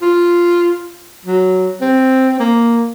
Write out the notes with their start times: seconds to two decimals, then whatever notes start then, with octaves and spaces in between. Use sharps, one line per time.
0.02 F4
1.25 F#3
1.81 C4
2.39 A#3